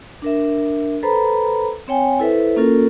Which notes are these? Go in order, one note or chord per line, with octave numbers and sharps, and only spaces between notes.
D4 A#4 E5
A4 B4 C5 A#5 B5
C4 C#5 G5 G#5
E4 A4 B4 C5 E5
A#3 C#4 F4 A4 A#4